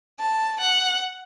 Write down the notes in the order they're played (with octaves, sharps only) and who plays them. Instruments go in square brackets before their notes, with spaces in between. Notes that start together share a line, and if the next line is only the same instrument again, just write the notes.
[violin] A5
F#5